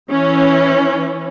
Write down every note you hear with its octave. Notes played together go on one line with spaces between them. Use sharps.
E3 C#4